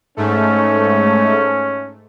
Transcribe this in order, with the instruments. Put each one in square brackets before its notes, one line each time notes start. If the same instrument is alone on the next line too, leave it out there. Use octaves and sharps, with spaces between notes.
[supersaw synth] G#2 A3 [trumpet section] C#4